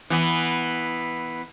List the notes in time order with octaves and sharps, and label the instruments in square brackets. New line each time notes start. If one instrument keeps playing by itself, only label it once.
[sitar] E3 B3